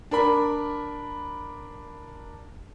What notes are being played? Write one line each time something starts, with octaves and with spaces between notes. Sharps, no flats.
D4 A#4 B5